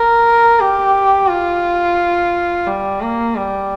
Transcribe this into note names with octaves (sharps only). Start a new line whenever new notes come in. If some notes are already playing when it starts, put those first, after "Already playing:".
Already playing: A#4
G4
F4
G3
A#3
G3